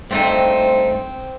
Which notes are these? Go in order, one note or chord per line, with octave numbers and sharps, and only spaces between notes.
G2 A3 C4 D#4 C5